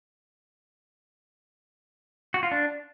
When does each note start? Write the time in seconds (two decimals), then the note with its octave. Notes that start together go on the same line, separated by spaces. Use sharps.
2.34 F#4
2.43 F4
2.51 D4